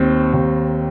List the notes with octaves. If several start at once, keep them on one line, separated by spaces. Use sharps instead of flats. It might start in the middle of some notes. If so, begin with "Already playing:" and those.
Already playing: D#2 D#3 C4
D#2